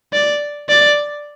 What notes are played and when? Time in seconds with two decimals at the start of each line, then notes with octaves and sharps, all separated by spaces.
0.13 D5
0.69 D5